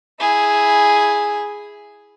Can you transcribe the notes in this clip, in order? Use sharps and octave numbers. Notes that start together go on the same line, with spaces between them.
E4 G#4